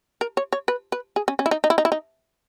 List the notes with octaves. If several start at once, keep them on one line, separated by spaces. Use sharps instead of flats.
A#4
C#5
C#5
B4
B4
G#4
C#4
C#4
E4
D#4
D#4
E4
D#4
E4
D#4